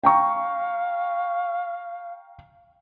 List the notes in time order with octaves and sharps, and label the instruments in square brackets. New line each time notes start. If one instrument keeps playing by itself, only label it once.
[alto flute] F5 [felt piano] G5 A#5 C#6